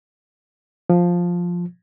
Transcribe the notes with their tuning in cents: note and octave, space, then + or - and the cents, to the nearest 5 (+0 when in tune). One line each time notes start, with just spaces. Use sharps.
F3 +5